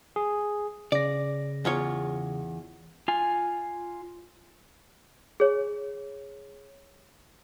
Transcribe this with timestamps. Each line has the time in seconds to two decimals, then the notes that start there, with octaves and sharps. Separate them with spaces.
0.16 G#4
0.92 C#3 D5 A#6
1.65 E2 F4 C#5
3.08 F4 G#5
5.40 G#4 C#5